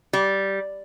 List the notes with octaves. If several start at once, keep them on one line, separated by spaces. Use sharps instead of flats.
G3